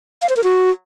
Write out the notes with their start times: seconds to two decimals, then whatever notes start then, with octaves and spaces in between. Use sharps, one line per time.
0.22 F5
0.29 C5
0.37 A#4
0.44 F#4